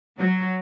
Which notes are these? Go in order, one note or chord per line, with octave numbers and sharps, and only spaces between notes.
F#3